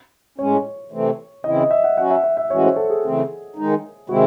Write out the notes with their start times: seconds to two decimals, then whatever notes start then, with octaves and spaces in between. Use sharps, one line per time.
0.38 A2 G#3 C#4 C#5
0.92 C3 E3 A3 C4
1.44 C#3 E3 C4 E4 D#5
1.58 D#5
1.71 E5
1.84 F#5
1.97 F#3 C#4 F#4 F#5
2.10 E5
2.24 E5
2.37 E5
2.50 A2 E3 G#3 C#4 F#4 C#5
2.63 C5
2.76 A4
2.90 G#4
3.04 C#3 E3 A3 C4
3.56 D#3 G#3 D#4
4.09 C3 D#3 G#3 C4 E4 F#4